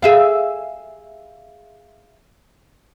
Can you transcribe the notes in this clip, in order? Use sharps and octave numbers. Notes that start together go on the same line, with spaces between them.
G#4 E5 F5